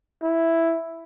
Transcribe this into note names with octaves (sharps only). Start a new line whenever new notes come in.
E4